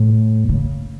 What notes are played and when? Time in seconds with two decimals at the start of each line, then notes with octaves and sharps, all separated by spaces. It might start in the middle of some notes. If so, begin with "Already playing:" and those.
Already playing: A2
0.49 C#3